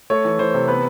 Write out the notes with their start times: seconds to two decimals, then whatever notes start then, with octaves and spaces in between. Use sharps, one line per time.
0.10 A3 C#5
0.25 E3
0.39 E3 C5
0.54 C3
0.68 B3 B4